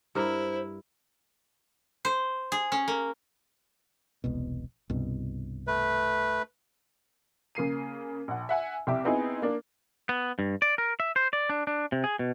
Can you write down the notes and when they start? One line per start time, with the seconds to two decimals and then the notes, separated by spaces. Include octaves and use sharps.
0.15 G2 E4 A#4 C5
2.05 C5
2.52 G#4
2.72 C#4
2.88 A#3
4.24 E1 C2 B2
4.90 C2 G2 B2
5.67 A3 B4
7.55 C#3 A#3 C7 D#7
8.28 A#1 F#5
8.49 E5 F#5 G#5
8.87 C2 C3 G4 E5 D6
9.04 B3 C4 D#4 E4 G#4
9.42 A#3 D4
10.09 B3
10.39 G2
10.62 D5
10.78 A#4
11.00 E5
11.16 C5
11.33 D5
11.50 D4
11.67 D4
11.92 C3
12.04 G#4
12.19 B2